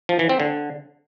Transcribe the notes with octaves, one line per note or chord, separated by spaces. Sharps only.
F3
E3
C4
D3